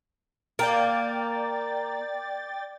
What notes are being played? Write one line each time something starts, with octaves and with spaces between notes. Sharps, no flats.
A#3 D5 G5 A6